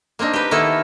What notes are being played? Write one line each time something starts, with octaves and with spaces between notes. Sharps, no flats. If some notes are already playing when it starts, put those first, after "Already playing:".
A#3 C4 D4 D#4
G4 B4
D#3 A#3 B3 E4 A4